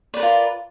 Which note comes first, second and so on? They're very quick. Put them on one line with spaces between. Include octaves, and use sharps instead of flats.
D5 B4 A#4 F4